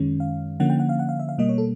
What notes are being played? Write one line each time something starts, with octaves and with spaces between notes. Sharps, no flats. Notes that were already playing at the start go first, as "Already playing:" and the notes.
Already playing: F#2 D#3 G#3 C#4
F5
D3 F3 A#3 C#4 F#5
G5
F#5
F5
F#5
F5
E5
F5
B2 G3 A#3 D#5
C#5
A4